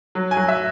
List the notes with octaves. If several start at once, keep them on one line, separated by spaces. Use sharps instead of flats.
F#3
G#5
F#3
E5